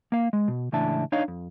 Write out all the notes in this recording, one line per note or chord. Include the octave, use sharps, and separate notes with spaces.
A#3 F5
G#3
B2
C#2 A2 E3 D4 E5 A5
D4 D#4 C#5 D#5 F5
F2